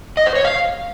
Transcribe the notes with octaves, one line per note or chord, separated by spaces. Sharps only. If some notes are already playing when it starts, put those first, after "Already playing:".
D#5
C5
C#5
F5